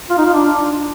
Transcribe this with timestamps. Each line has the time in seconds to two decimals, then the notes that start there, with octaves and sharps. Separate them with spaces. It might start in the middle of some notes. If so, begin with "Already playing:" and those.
0.10 F4
0.18 D#4
0.26 F4
0.33 D4